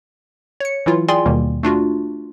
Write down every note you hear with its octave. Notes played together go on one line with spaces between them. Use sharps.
C#5 C#7
E3 F#3 E4 F4
F4 G#4 D5 G5 G#5 C6
D#2 B2 D#3 G3 A#3
A3 D4 F4 F#4